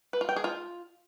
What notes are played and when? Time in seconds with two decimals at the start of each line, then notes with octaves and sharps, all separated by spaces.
0.13 B4
0.21 F4
0.29 G5
0.36 G#4
0.44 F4